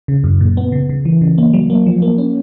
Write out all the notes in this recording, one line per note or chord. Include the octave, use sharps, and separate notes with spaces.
C#3
F#2
A#2
B3
C#3
C#3
E3
C#3
A#3
F#3
A#3
F3
A#3
C#4